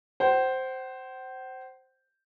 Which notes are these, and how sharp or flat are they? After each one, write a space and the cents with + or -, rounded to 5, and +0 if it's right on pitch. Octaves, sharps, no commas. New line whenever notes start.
C5 +0 F#5 +45